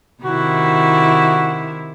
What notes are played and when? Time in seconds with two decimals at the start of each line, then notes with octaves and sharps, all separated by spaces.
0.24 C3 D#3 E4 F#4